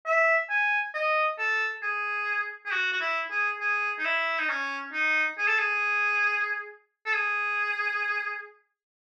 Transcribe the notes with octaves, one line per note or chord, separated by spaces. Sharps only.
E5
G#5
D#5
A4
G#4
G#4
F#4
F#4
E4
G#4
G#4
D#4
E4
D#4
C#4
D#4
G#4
A4
G#4
A4
G#4